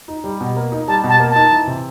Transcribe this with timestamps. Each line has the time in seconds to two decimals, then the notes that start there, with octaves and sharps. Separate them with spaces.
0.08 D#4
0.24 G3
0.41 B2
0.56 A#3
0.72 D#4
0.88 G3 A5
1.04 B2
1.09 A5
1.20 A#3
1.31 D#4 A5
1.52 E3
1.67 C3